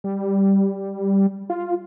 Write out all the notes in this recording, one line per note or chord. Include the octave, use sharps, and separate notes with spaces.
G3
F4